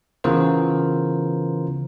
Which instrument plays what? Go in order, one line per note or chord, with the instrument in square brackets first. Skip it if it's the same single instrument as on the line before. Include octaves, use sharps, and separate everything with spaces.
[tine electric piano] C#3 E3 B3 F4 A#4 C5